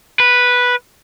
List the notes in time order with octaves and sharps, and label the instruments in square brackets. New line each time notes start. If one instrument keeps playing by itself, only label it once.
[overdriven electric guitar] B4